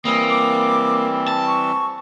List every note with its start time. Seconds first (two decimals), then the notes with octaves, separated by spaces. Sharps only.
0.05 E3 G3 A#3 C4 D#6
0.29 D6
1.28 A5
1.47 C#6